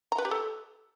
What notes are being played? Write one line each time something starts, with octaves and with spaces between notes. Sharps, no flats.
A#5
B4
G4
A4